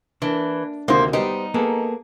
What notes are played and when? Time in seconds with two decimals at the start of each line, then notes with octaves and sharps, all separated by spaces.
0.22 E3 A#3 D4
0.88 D2 C3 D#3 A#3 C5
1.13 G3 B3 D#4 G4 C5
1.54 A#3 B3 G#4 A4